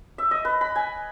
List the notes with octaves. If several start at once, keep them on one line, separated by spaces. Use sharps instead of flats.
E5
D#5
B4
B5
G#5